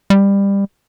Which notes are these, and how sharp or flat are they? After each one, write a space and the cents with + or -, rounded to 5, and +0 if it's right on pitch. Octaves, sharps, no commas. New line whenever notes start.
G3 +20